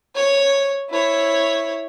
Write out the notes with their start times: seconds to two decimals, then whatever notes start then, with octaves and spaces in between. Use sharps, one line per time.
0.16 C#5
0.90 E4 C#5